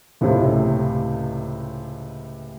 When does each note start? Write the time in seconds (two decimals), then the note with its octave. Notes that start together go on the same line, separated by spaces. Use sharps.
0.21 C#2 A2 C3